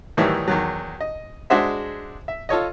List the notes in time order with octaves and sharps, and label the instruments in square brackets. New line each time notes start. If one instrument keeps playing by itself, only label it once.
[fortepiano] A2 D#3 E3 F#3 G3 E4
E2 D#3 F#3
D#5
G#3 D4 F#4 G#4 C5 E5
E5
F4 A4 C#5 D#5